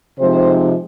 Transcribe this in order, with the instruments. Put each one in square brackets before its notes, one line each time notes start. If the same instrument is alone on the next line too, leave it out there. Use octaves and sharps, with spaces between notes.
[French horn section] C3 F3 G#3 C4 D#4 C5